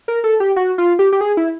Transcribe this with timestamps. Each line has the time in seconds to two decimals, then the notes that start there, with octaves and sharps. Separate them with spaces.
0.08 A#4
0.24 A4
0.40 G4
0.56 F#4
0.78 F4
0.99 G4
1.13 G4
1.21 G#4
1.37 E4